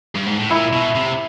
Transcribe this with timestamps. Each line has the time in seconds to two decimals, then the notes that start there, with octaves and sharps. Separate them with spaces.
0.15 G2
0.26 G#2
0.38 A2
0.50 A#2 E4
0.73 B2
0.95 C3